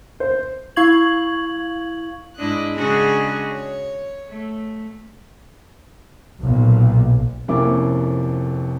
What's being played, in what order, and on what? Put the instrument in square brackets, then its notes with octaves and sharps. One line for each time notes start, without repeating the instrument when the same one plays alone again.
[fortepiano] C5
[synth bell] E4 F5 C#6 G#6 F#7
[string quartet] G#2 G#3 D4 E4 D#5 F#6
C#3 G#3 D4 F#4 G#4 D#5
C#5
A3
[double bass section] B1 A#2
[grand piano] F1 F2 A#3 C#4 E4 D6